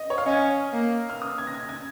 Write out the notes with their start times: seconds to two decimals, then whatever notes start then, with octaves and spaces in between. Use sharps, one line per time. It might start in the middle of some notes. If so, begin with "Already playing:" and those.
Already playing: D#5
0.10 C#5
0.18 F5
0.26 C#4 D#5
0.73 A#3
1.10 F6
1.22 D#6
1.38 G#6
1.47 A#6
1.54 G#6
1.69 G#6